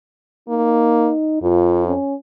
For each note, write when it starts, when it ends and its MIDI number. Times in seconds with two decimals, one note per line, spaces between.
0.48 1.11 58
0.48 1.41 63
1.42 1.93 41
1.42 1.83 65
1.88 2.14 61